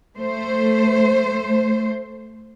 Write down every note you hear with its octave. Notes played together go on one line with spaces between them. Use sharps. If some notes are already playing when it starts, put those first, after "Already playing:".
A3 C5